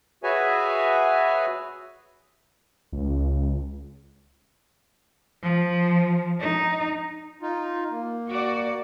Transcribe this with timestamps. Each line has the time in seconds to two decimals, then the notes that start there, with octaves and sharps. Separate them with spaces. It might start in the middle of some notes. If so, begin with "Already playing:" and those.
0.23 F#4 G#4 B4 C#5 E5 G#5
2.92 C#2
5.43 F3
6.40 D#4
7.42 D#4 F4
7.91 A#3
8.28 F#4 D5